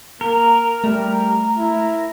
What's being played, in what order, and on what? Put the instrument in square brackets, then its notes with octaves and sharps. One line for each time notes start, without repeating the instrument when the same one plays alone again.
[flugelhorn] A#3 [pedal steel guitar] A#4
[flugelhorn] G3 [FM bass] A3
[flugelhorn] E4